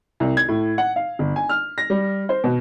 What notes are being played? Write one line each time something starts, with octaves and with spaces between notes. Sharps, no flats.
C2
G#6
A2
F#5
F5
G1
G#5
F6
A#6
G3
C5
B2